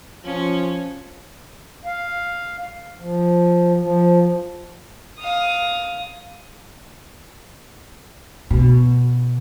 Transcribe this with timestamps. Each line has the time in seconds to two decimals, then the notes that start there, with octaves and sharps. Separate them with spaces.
0.25 F3 C#4
1.85 F5
2.99 F3
3.80 F3
5.20 F5 D#6
8.51 B2